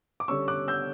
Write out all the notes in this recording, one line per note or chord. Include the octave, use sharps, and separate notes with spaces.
D6
D3 G3 C#4 C#6 E6
D6 F#6
E6 G6